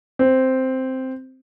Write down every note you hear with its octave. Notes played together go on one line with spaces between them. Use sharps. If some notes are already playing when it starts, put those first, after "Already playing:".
C4